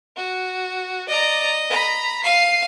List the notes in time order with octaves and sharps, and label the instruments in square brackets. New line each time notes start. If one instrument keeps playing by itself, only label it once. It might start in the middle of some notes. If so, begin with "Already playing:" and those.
[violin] F#4
[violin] D5 A#5 [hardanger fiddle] D#5
[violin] A#5 B5
[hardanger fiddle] F5 [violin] C7 D#7